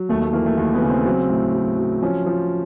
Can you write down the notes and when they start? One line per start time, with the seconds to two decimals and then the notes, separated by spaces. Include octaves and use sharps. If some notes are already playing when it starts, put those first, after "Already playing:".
Already playing: F#3
0.09 D#2 A3
0.22 A3
0.33 E3 A#3
0.46 A3
0.57 D#2 A#3
0.74 B3
0.82 C#3
0.89 C4
1.06 F#3 C4
1.30 A2
1.55 F#3
1.79 F#3
2.02 F3 C#4
2.26 F3